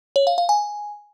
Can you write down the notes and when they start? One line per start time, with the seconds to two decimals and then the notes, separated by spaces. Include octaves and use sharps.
0.16 C#5
0.27 F5
0.38 F5
0.49 G#5